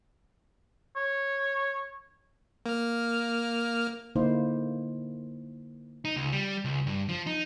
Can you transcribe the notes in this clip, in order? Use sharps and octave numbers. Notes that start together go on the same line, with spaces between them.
C#5
A#3 F6
D3 A#3 D#4 E4 C5
D#4
C#2
G3
C#2
G2
F3
D#4